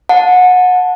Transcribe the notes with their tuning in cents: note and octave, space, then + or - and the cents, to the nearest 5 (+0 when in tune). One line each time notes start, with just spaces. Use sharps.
F#5 -25 A5 +0